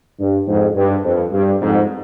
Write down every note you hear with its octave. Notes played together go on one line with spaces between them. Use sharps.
G2
F2 G#2
G2
F2
G2
F2 G#2